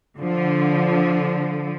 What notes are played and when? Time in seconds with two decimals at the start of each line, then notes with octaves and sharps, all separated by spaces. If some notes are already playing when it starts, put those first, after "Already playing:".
0.19 D3 F3